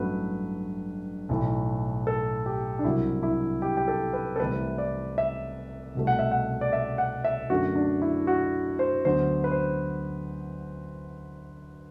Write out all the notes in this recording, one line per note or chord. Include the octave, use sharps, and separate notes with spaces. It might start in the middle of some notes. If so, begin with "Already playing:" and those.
Already playing: A1 G2 F#3 A3 B4
B1 A2 E3 A3
A4
G4
D4
C2 C3 F#3 E4
E4
G4
G4
A4
B4
A4
C2 C3 E3 A3 B4
D5
E5
C2 B2 A3
F#5
E5
F#5
D5
E5
F#5
E5
F#2 D3 A3 F#4
D4
E4
F#4
C5
D2 D3 F#3 B3 C5
B4
C5